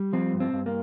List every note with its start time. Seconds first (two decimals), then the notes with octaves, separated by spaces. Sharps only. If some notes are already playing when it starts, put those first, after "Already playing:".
Already playing: G3
0.13 F3 C4
0.34 G2
0.40 C4
0.53 G2
0.66 A#3